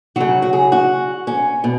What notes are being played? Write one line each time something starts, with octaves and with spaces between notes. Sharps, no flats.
C#3 F#3 F#4
F#4
G#4
F#4
C#4
B2